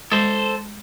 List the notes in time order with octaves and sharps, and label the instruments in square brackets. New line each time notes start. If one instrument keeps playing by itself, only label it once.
[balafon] G#3 [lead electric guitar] A4 C5